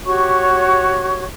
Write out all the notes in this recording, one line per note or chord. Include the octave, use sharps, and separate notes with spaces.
F#4 G4 C#5 C#6